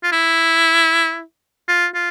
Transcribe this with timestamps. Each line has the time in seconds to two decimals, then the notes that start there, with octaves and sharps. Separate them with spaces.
0.04 F4
0.12 E4
1.68 F4
1.95 F4